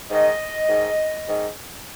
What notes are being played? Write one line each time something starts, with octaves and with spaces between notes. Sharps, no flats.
G#2 D#3 D#5
G#2 D#3
G#2 D#3